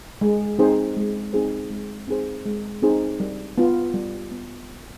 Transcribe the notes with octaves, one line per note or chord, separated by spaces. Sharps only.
G#3
C4 D#4 G#4 C5
G#3
C4 D#4 G#4 C5
G#3
C4 D#4 G#4 C5
G#3
C4 D#4 G#4 C5
G3
B3 F4
G3
B3